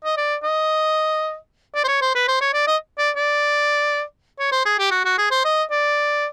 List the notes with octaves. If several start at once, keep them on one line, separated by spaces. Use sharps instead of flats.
D#5
D5
D#5
D5
C5
C#5
C5
B4
C5
C#5
D5
D#5
D5
D5
C#5
C5
G#4
G4
F#4
F#4
G#4
C5
D#5
D5